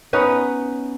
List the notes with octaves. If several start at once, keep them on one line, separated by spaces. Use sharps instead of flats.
B3 C#4 D#4 B4